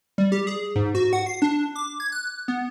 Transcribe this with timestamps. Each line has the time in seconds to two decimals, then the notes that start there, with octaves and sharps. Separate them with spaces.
0.18 G3
0.32 G4
0.47 G#4
0.76 G#2
0.95 F#4
1.13 F#5
1.26 C7
1.42 D4
1.76 D6
2.00 G#6
2.12 F#6
2.48 B3